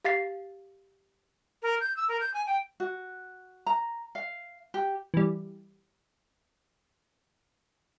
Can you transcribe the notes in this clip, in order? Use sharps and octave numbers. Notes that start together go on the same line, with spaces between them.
G4 F5 A6 C7
A#4
G6
E6
A#4
G6
G#5
G5
F#4
A#5
F5
G4
E3 G3